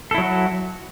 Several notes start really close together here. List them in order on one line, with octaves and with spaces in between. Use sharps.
A4 E4 F#3 F#4